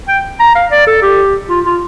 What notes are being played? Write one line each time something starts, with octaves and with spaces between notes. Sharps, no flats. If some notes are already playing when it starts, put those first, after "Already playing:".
G5
A#5
F5
D5
A4
G4
F4
F4